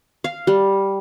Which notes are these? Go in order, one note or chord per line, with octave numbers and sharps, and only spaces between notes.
F5
G3